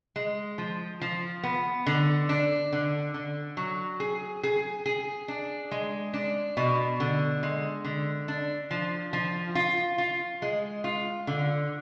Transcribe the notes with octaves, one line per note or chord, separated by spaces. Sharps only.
G#3
F3
F3
B3
D3
D4
D3
D3
F#3
G#4
G#4
G#4
D4
G#3
D4
B2
D3
G#3
D3
D4
F3
F3
F4
F4
G#3
F4
D3